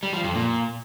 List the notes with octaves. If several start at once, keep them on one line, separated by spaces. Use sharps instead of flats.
G3
F3
F2
A#2